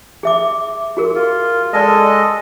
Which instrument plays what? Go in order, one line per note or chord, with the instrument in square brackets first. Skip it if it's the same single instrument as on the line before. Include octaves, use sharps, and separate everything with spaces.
[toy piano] G#4 E5 D6
F#4 G#4 A#4
[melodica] F4
[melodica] G#3 A4 D#5 [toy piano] B4 D5